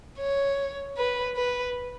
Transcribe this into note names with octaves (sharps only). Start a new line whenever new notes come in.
C#5
B4
B4